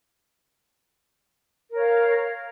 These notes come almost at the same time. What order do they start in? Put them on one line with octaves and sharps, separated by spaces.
A#4 C#5 F5